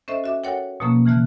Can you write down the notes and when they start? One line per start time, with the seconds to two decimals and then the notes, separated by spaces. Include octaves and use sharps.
0.08 C#4 A4 C5 D#5 E5
0.24 F#4 E5 D6
0.44 F#4 A4 A#4 C#5 F#5 G5
0.80 B2 F3 A3 A#3 C#4
1.05 C#3 E3 A3 F6 F#6